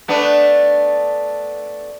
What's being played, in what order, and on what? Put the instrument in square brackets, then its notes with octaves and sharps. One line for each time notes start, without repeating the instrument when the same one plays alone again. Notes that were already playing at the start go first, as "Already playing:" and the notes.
[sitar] A3 B3 D4